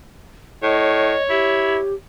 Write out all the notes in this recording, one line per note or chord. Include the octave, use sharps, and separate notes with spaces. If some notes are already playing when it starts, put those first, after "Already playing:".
A2 C#5 D#5
E4 G4